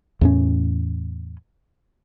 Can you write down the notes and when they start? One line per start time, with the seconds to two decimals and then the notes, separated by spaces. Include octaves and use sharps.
0.21 E2 A2 C#4